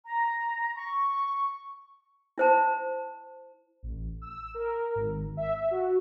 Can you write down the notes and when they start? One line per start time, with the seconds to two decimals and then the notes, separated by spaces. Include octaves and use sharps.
0.05 A#5
0.76 C#6
2.38 E4 C5 A5
3.83 A1
4.22 E6
4.54 A#4
4.95 G#1
5.37 E5
5.71 F#4